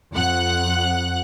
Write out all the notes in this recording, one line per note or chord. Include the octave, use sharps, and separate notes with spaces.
F2 F#5 F#6